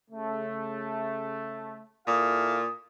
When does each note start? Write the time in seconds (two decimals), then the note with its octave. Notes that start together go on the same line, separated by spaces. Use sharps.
0.10 C#3 A3
2.07 A#2 E4 A4 F5 D#6